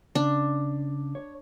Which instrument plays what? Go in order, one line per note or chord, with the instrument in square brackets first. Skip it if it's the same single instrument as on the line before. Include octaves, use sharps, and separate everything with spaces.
[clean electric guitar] C#3 [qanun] D4
[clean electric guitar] C#5